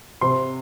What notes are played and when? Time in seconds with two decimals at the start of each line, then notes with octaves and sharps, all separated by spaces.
0.21 C3 C6